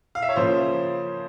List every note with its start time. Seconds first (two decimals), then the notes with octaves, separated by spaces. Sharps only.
0.15 F5
0.22 E5
0.29 C#5
0.36 C#3 F3 A#3 C#4 C5